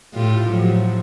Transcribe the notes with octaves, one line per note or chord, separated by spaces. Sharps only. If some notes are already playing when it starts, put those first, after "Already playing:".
A2 F4 G4
A2 F3 F#3